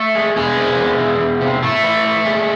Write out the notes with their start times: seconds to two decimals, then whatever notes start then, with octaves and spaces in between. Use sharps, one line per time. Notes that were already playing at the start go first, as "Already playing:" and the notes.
Already playing: A3
0.15 G#3
0.36 E2 G#3
0.57 C3
0.78 E2
0.99 E3
1.20 E2
1.41 C3
1.62 A2 A3
1.83 E3
2.04 A2
2.25 G#3